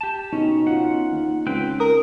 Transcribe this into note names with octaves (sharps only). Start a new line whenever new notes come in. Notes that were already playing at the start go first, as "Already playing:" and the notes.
G4 A5
B2 C#4 D#4
C#4 F4 F#5
D#2
C#2 C4 B4 G5
A#4 D#6